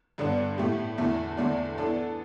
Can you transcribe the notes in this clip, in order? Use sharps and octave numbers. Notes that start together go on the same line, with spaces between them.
G2 D3 B3 D4
A2 A3 G4
E2 D3 A3 E4 A4
E2 D3 A3 D4
E3 B3 D4 A4